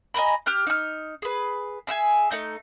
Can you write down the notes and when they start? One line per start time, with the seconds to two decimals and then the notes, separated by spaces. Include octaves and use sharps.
0.14 D#5 G#5 A#5 B5
0.46 G4 F6 F#6
0.67 D#4 F6
1.22 G#4 B4
1.87 G#4 E5 F#5 G#5
2.31 A3 D#4 G6